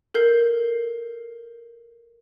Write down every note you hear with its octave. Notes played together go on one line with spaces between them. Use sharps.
A4 A#4 G6 C7